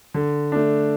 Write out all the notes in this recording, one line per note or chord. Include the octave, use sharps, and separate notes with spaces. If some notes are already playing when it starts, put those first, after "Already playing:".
D3
A3 D4